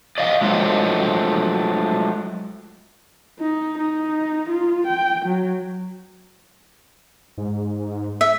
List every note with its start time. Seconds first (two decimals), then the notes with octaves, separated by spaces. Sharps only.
0.18 D5 D#5 F5
0.41 F#3 G#3 A3 F4 C5
3.40 D#4
3.79 D#4
4.50 F4
4.87 G5
5.26 F#3
7.38 G#2
8.21 E5